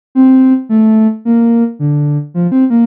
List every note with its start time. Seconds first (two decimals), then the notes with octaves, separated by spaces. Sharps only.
0.15 C4
0.69 A3
1.25 A#3
1.79 D3
2.34 F3
2.52 C4
2.70 A#3